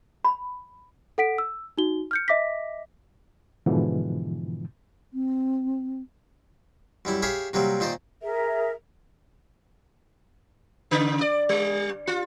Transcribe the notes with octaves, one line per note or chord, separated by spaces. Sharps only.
B5
A4 F#5 B6 D7
E6
D#4 F#4 G7
F6 G6 C#7
D#5 E5 D6 A#6 B6
G#2 B2 D3 E3 F3
C4
F#2 G3 E4
G4 G#4 C#5 E5 F5 B5
C3 F#3 G3 A#3 C4
A#2 D#3 C5 D5 D#5
G#4 A#4 E5
C#3
D5
G3
F4